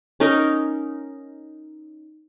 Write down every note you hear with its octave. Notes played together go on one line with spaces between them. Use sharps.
C#4 D#4 A#4 D#5